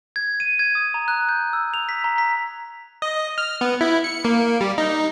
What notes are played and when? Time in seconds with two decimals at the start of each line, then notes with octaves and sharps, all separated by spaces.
0.16 G#6
0.40 D#7
0.59 G#6
0.75 D#6
0.94 A#5
1.08 F#6
1.29 G6
1.53 E6
1.74 F7
1.89 B6
2.04 A#5
2.18 B6
3.02 D#5
3.38 F6
3.61 B3
3.81 E4
4.04 C#7
4.25 A#3
4.61 G3
4.78 D#4